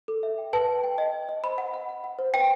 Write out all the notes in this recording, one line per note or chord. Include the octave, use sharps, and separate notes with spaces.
A4
E5
G5
B4 A5
G5
G5
D#5
D#5
D#5
C5 B5
F#5
F#5
F#5
F#5
C5
B4 G5